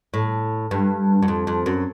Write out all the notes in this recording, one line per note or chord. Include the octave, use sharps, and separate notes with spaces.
A2
G2
F#2
F2
F2
F#2